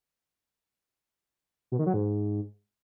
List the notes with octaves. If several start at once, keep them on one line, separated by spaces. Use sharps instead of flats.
B2
D#3
F#3
G#2